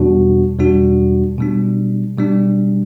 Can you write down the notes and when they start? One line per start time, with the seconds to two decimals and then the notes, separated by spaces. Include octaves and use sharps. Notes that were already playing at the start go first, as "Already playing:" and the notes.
Already playing: E2 B2 G3 D4 F#4
0.58 E2 B2 G3 D4 F#4
1.38 B2 G3 D4
2.18 B2 G3 D4